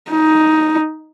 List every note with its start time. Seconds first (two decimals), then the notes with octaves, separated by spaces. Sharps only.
0.11 D#4